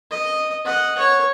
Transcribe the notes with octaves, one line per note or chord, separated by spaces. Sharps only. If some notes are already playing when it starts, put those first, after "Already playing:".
D#5
D#5 F#5
C#5